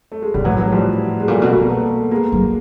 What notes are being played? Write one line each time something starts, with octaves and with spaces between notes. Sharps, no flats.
A3
G#3
A#2 G3
A2 E3 F#3
E3 F#3
F3 G3
G#3
A#2 G3 A3
B2
B2 A#3
A3 B3
G#3 A#3
F#3